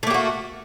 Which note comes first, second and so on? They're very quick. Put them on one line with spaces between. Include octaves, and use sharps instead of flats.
A3 A#3 G4 F#4